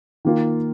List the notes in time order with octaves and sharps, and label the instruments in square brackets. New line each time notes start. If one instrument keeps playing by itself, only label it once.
[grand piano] D#3 A#3 F4